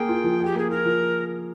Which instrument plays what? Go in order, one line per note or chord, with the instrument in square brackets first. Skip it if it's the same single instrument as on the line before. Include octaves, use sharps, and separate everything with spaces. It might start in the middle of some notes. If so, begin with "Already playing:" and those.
Already playing: [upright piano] A#3 G#4 [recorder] G5
[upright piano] F4
F3
G#4
[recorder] G4
[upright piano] A#3 [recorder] G#4
[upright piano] F4 [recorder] A#4
[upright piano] F3